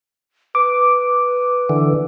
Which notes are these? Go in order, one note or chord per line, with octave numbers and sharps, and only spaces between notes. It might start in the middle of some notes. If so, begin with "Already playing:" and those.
B4 D6
D3 E3